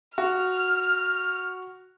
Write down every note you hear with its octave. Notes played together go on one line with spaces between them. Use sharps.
F#4 F6